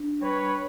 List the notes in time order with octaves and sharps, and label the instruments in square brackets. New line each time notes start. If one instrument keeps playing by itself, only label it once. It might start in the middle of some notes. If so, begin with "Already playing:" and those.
Already playing: [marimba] D4
[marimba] G3 [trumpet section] B4 C#5